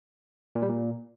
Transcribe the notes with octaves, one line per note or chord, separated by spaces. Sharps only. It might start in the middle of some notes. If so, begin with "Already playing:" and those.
A#2
G3
A#2